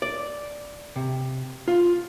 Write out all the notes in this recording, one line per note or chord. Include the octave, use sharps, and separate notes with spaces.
D5
C3
F4